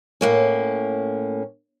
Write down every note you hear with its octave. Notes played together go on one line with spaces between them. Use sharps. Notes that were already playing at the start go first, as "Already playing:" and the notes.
A2 A#3 C#4